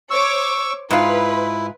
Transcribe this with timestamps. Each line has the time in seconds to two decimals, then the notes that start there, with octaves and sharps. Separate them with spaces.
0.11 C5 C#5 C#6 D6 E6
0.91 G#2 E4 F4 B4